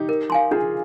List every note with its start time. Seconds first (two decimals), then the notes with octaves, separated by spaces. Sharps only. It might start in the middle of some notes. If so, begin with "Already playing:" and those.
Already playing: D#4 G4
0.09 A#4
0.30 F5 G#5 C6
0.51 D4 F4 G#4